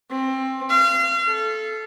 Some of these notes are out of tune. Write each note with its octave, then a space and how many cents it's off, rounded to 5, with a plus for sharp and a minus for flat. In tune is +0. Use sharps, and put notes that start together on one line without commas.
C4 +20
F5 -35
A4 -15